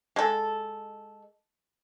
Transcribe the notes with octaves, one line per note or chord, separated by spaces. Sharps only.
G#3 A4